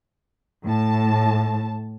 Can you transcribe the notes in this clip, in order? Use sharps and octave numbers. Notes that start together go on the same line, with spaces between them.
A2 A5